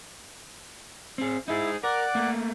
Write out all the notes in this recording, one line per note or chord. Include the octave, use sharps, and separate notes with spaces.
C4 G#4
D#4 E4 G#4
A#4 D5 F#5 D6
A3 A#3